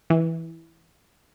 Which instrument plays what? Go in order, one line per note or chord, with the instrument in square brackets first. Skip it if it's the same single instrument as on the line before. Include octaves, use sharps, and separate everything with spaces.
[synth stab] E3